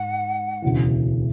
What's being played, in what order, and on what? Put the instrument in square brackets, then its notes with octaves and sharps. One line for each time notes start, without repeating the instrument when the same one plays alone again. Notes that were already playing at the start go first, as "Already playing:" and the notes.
Already playing: [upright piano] G#2 [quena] F#5
[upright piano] E1 D2 C#3 E3